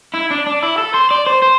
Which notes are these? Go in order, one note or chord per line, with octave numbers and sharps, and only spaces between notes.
E4
D4
D4
E4
A4
C5
D5
C5
C5